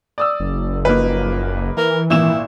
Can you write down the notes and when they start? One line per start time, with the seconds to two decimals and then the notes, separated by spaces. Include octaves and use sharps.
0.18 D5 D#6 E6
0.40 F#1
0.85 F3 A#3 D#4 B4
1.77 E3 A#4
2.10 G#1 A#2 E3 E4 E7